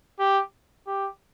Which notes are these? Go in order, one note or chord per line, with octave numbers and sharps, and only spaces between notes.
G4
G4